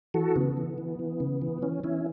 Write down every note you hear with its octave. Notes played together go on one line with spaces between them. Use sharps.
E3 F#4 A4
C#3 B3
E3
E3
E3
C#3
E3
E3 C#4
E3 C#4 E4